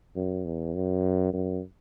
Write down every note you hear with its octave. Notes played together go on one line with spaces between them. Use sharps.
F#2
E2
F#2
F#2